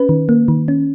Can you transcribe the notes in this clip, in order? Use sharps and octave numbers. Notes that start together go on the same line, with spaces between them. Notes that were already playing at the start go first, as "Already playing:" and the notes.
Already playing: C#4 B4
D#3
A#3
D#3
C#4